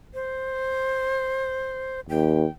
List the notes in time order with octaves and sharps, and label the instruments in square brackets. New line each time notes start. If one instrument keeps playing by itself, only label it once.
[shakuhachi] C5
[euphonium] D#2 [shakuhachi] G5